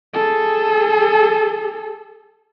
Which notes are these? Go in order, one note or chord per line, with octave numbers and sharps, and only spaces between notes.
G#4 A4